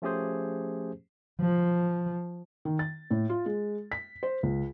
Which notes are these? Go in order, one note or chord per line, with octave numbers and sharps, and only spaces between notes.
F3 A3 C#4 G4 G#4 C5
F3
D#3
A6
A2
F4
G#3
B6
C5
C#2